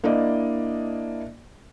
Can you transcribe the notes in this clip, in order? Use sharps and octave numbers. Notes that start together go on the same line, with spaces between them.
A#3 D4 E4 D5 D#5